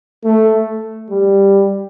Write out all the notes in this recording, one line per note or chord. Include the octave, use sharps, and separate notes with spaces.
A3
G3